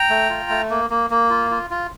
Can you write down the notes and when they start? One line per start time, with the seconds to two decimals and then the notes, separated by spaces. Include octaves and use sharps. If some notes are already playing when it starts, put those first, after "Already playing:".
Already playing: G5 A#5
0.10 A3
0.30 F4
0.49 A3
0.70 A#3
0.90 A#3
1.10 A#3
1.30 F4
1.51 F4
1.70 F4